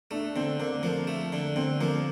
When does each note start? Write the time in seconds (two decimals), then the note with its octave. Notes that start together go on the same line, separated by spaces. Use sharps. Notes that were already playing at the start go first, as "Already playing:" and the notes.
0.11 A3 D4
0.36 D3 C4
0.59 D3 A#3
0.83 F3 A#3
1.07 A3
1.33 D3
1.56 D3 C4
1.80 F3 A#3